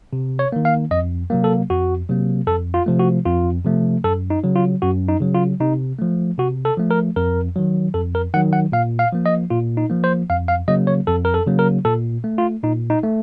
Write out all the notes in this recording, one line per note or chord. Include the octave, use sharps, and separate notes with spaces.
C3
C#5
D#3 A#3
F5
F2 D#5
C3 F#3 A#3
A4
F2 F#4
C3 F#3 A#3
F2 A4
F4
C3 F3 A3
F#4
F2 F4
C3 F3 A3
F#2 A4
D#4
C#3 F#3
F4
F#2 F#4
D#4
C#3 F#3
F4
C3 D#4
F3 A3
C3 F#4
A4
F3 A3
A#4
F2 A#4
D#3 F#3
F2 A4
A#4
D#3 F#3 F#5
F#5
A#2 F5
F5
F3 A#3
D#5
A#2 F4
D#4
F3 A#3
C5
F2 F5
F5
C#3 F#3 A#3 D#5
C#5
F2 A4
A#4
A4
C#3 F#3 A#3
A#4
A#2 A4
A3
F4
A#2 D#4
D#4
A3